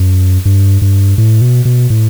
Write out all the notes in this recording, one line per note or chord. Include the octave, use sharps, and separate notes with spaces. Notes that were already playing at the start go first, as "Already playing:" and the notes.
Already playing: F#2
G2
G2
A2
B2
B2
A2